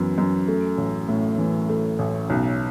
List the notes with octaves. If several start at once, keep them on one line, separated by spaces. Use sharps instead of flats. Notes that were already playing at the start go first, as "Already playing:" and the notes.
Already playing: F#2 E3 B3
F#2
A3
A1
A2
E3
A3
A1
B1